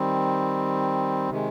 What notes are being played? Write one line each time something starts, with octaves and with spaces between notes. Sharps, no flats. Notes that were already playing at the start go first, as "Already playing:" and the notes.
Already playing: D#3 G3 C4
C3 D#3 G#3